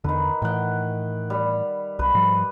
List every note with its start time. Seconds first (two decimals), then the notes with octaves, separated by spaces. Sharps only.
0.04 E2 D3 D#3 B4
0.42 A2 E3 F#5 G5
1.30 G3
1.99 B1 B4
2.14 G#2 F3 G3